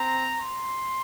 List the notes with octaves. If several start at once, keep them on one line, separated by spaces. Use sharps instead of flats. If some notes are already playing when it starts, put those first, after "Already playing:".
Already playing: C4 A#5
C6